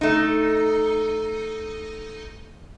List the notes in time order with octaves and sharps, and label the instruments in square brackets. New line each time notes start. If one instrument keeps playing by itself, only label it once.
[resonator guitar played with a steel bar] A3 D#4